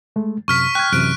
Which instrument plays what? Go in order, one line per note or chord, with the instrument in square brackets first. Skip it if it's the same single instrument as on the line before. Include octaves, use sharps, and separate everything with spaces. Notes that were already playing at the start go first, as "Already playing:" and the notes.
[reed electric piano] G#3 A3
[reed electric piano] F#2 C3 [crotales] C#6 F6 B6
[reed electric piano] G5 G#6 [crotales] C#6 F#6
[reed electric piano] F#2 C3 E3 [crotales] F#6 D7